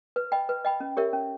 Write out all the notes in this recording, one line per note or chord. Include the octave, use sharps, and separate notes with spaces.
B4
D#5 G5 B5
B4
D#5 G5 B5
C#4
G4 A#4 C#5 E5
C#4